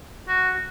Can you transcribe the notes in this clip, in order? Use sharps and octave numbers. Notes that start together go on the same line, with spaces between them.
F#4